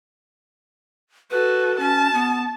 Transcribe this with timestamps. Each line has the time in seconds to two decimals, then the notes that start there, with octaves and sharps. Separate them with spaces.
1.31 F#4 A4 B4
1.80 C#4 A5
2.14 B3